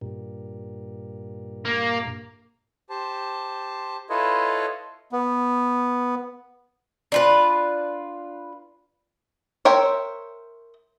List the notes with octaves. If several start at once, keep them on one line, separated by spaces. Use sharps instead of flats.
G2 A#2
A#3
G4 C5 A5
E4 F4 A4 B4 C#5 D#5
B3
D4 F4 B4
A#4 C5 C#5 E5 G5